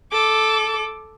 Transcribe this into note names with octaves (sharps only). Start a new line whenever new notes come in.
A4 D6